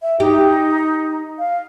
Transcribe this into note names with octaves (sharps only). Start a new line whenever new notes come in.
E5
D#4 G4
F5